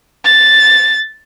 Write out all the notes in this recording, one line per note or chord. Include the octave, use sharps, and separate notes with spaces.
A6